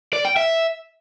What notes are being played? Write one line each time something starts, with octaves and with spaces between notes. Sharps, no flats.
D5
G5
E5